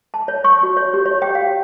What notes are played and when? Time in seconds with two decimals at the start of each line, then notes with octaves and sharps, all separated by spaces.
0.14 A5
0.28 C#5
0.44 C#6
0.63 F#4
0.77 C#5
0.94 G4
1.06 C#5
1.22 G5
1.35 F5